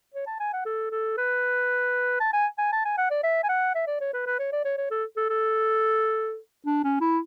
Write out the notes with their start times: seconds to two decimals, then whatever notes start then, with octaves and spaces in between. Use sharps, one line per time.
0.14 C#5
0.27 A5
0.40 G#5
0.53 F#5
0.65 A4
0.91 A4
1.17 B4
2.20 A5
2.33 G#5
2.58 G#5
2.72 A5
2.85 G#5
2.98 F#5
3.11 D5
3.23 E5
3.43 G#5
3.49 F#5
3.75 E5
3.87 D5
4.01 C#5
4.13 B4
4.26 B4
4.39 C#5
4.53 D5
4.65 C#5
4.77 C#5
4.91 A4
5.17 A4
5.29 A4
6.66 D4
6.84 C#4
7.01 E4